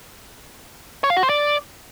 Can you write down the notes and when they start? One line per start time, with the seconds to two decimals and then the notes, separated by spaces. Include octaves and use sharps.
1.04 C#5
1.10 F5
1.17 F#4
1.23 C5
1.29 D5